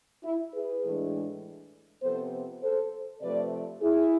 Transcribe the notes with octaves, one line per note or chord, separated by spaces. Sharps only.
E4
G#4 B4
A2 E3 G#3 D4
C3 F3 B3 A4 C5
A4 C5
C3 F3 A3 B4 D5
E4 G#4